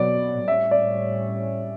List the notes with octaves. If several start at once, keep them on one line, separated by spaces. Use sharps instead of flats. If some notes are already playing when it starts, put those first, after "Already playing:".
Already playing: B2 F#3 B3 D5
A2 G3 C#4 E5
D5